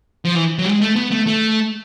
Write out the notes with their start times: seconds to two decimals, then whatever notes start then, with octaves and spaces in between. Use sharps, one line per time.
0.25 F3
0.35 E3
0.58 F#3
0.65 G3
0.69 G#3
0.81 A3
0.96 B3
1.11 A3
1.27 A3